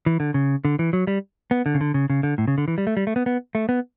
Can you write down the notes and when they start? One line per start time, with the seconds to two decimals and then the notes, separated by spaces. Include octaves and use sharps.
0.06 E3
0.20 D3
0.34 C#3
0.65 D3
0.79 E3
0.93 F#3
1.07 G3
1.51 B3
1.66 D3
1.74 C#3
1.81 D3
1.94 C#3
2.10 C#3
2.23 D3
2.38 A2
2.48 C#3
2.58 D3
2.68 E3
2.78 G3
2.87 A3
2.97 G3
3.07 A3
3.16 B3
3.26 B3
3.55 A3
3.69 B3